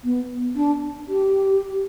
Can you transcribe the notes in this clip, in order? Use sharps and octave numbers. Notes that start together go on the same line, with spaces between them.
B3
D4
G4